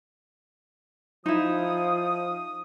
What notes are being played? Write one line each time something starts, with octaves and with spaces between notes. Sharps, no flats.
F3 D#4 E4 D#6